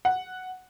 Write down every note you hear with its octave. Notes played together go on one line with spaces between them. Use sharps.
F#5